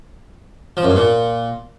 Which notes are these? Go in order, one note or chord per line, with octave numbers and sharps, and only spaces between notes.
F3
F#2
G2
A#2